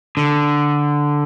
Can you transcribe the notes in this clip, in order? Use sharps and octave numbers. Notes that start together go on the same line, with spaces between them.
D3